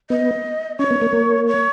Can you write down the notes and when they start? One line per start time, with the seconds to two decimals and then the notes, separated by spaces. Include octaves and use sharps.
0.10 B3 D#5
0.78 C#4 C#5
0.91 B3
1.02 A#3
1.13 A#3
1.48 C#5